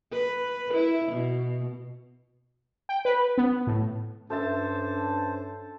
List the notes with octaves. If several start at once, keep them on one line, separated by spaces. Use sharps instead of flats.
B4
E4
B2
G5
B4
B3
A2
G2 C#4 A4 C5 E5 A5